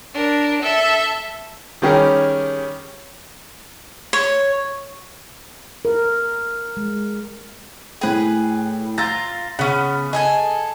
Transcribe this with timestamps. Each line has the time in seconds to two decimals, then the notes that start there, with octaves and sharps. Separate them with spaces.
0.14 D4 A#4
0.62 A4 E5
1.82 D#3 G3 C#4 G4 G#4 A#4
4.13 C#5
5.85 A#4
6.77 G#3
8.01 A2 G#4 B4 G5
8.98 F4 A#5 E6 A6
9.59 C#3 B3 C#4
10.13 G#4 A4 D#5 G#5